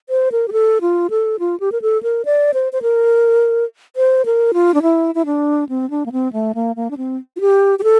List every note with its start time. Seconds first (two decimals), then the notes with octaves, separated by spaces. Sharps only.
0.09 C5
0.32 A#4
0.48 G4
0.53 A4
0.81 F4
1.10 A4
1.39 F4
1.60 G4
1.72 A#4
1.82 A4
2.03 A#4
2.25 D5
2.54 C5
2.73 C5
2.82 A#4
3.96 C5
4.26 A#4
4.54 F4
4.74 D4
4.82 E4
5.15 E4
5.26 D4
5.69 C4
5.90 D4
6.06 A#3
6.12 C4
6.33 A3
6.55 A#3
6.76 A#3
6.91 D4
6.97 C4
7.36 F4
7.41 G4
7.79 G4
7.84 A4